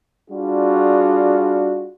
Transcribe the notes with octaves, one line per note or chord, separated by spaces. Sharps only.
G3 D4 F4 F#4 G#4